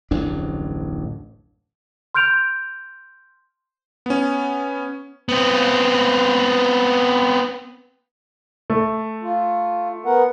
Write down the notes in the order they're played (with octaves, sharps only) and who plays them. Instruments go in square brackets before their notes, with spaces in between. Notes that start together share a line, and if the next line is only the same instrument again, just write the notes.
[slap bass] D1 A1 F2 D4
[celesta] C6 F6 G6 D7 F7
[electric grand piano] B3 C#4
[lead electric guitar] B3 C4
[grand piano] A3
[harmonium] F4
B3 A#4 F#5